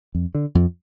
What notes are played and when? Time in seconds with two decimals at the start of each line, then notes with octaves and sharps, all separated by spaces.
0.15 F2
0.35 D3
0.55 F2